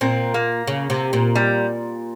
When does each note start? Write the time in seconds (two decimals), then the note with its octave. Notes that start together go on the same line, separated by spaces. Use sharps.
0.01 A#2 C4
0.34 A#3
0.67 C#3
0.90 C3
1.13 A#2
1.35 G3